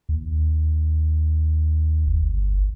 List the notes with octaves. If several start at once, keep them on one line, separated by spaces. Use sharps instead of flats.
D#2
G1